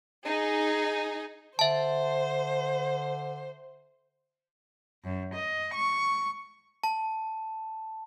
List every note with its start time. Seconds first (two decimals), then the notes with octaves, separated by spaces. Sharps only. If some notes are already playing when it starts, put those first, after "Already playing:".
0.24 D#4 G#4
1.59 D3 C5 E5 A5
5.04 F#2
5.35 D#5
5.74 C#6
6.84 A5